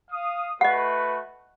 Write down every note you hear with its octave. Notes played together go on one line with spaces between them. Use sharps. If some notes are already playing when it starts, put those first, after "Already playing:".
F5 D#6
A3 F#4 B4 D#5 F#5